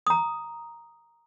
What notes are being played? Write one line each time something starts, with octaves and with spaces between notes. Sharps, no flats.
A#5 D#6